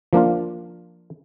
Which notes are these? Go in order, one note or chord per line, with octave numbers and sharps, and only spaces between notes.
F3 A#3 D4 F4